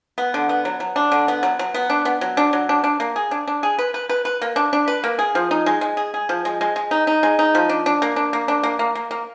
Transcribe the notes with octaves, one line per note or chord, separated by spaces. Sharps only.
B3
D3
B3
F#3
F#3
D4
D3
B3
F#3
F#3
B3
D4
B3
F#3
D4
F#3
D4
D4
A#3
G#4
D4
D4
G#4
B4
B4
B4
B4
A#3
D4
D4
B4
A#3
G#4
F3
D#4
G#3
G#3
G#4
G#4
F3
G#3
G#3
G#3
D#4
D#4
G#3
D#4
F3
D4
D4
A#3
D4
A#3
D4
A#3
A#3
A#3
A#3